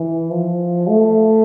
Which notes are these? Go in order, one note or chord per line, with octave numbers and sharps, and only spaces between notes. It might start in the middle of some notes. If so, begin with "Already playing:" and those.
Already playing: E3
F3
A3